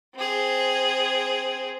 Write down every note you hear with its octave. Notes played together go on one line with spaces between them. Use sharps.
C4 G#4